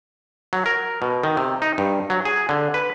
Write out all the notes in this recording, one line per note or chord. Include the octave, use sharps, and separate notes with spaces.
F#3
A#4
B2
D#3
C3
D#4
G2
F#3
G#4
D3
B4